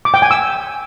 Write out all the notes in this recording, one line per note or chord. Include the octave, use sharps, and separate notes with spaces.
D6
G5
G#5
E6